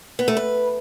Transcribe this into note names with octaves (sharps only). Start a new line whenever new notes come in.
B3
A3
B4